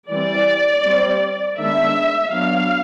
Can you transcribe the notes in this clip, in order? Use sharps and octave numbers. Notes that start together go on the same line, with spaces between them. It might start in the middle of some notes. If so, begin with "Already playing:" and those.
E3 G3 C4 D5
G3 C4
D#3 G#3 B3 D4 E5
F#3 B3 D4 F5